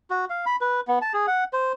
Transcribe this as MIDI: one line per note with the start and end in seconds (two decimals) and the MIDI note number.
0.10 0.25 66
0.30 0.45 77
0.46 0.56 83
0.61 0.81 71
0.88 0.99 59
1.02 1.13 81
1.14 1.26 68
1.27 1.44 78
1.53 1.72 72